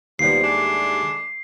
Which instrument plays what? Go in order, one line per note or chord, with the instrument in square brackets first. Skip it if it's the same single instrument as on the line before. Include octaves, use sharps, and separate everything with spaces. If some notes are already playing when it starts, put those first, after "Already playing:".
[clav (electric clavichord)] D#2 G3 [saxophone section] B2 F3 [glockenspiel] C7
[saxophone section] G#3 A3 D4